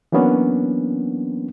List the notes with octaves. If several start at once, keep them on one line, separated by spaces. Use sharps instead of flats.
E3 F#3 A#3 B3 C#4 D4